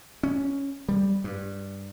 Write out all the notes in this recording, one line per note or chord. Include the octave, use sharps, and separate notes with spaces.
C#4
G3
G2